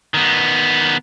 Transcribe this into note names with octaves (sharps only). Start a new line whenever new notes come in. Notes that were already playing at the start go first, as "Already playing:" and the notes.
D#3 B3